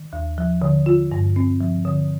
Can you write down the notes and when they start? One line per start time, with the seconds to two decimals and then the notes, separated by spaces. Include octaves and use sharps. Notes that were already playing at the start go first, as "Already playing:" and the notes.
Already playing: D#3
0.13 D#2
0.38 F3
0.62 D3
0.86 F4
1.12 G2
1.36 C4
1.61 F3
1.85 D3